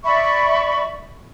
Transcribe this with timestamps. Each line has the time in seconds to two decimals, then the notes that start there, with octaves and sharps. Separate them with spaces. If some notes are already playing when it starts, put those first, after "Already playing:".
0.04 D5 E5 B5 C#6